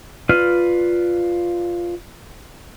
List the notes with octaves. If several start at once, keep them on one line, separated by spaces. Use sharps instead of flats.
F4 B4 D5 F6